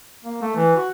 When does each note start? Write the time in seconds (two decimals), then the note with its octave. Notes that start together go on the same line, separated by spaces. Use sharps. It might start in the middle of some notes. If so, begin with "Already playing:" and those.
0.25 A#3
0.42 A3
0.56 E3
0.76 F#4